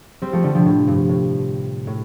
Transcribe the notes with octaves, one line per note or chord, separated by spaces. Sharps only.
G3 C4
F3 A3
D3 G3
C3 F3
A2
G2
A2
A2